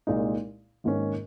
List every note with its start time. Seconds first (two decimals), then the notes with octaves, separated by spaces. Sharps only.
0.07 C2 A#2 G#3 D#4
0.84 G#1 G#2 D#3 A#3 C#4